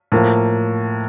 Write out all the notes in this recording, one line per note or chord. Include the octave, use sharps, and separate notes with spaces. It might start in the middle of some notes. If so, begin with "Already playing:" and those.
A2 F3 A#3